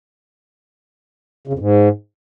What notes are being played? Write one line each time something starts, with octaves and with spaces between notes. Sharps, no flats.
C#3
F2
G#2